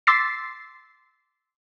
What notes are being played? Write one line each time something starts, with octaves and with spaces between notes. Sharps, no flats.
C6 D6 E6 A6 B6 C7